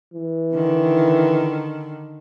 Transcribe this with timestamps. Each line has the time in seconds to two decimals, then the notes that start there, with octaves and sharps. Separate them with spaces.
0.13 E3
0.54 D3 D#3